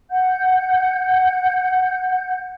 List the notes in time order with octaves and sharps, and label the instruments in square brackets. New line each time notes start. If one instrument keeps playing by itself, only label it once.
[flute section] F#5 G6